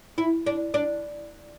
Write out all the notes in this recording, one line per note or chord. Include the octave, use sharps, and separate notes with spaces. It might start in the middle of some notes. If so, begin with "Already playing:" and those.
E4
D4
D4